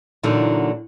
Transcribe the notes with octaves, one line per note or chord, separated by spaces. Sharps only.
A#2 D3 E3 F#3 A#3 D#4